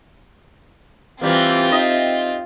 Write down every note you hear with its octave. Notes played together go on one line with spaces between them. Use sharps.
E3 G3 A#3 C4 F4
D#4 D#5 E5